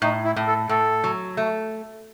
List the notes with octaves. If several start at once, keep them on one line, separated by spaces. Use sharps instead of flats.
A2 D#4
E4
A2
A4
A2 A4
F#3
A3